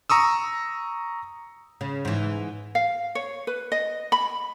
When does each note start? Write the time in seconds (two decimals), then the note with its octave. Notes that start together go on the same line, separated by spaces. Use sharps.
0.10 A#5 C#6 D#6 E6
1.81 C#3
2.05 G#2 E3
2.75 F5
3.15 C#5
3.47 B4
3.72 D#5
4.12 B5